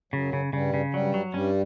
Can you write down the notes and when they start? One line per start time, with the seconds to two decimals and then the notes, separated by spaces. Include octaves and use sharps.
0.13 F#2 C#3 F#3
0.33 C#3
0.53 G2 C#3 G3
0.74 C#3
0.93 G2 F#3 G3
1.14 F#3
1.34 G2 G3 C#4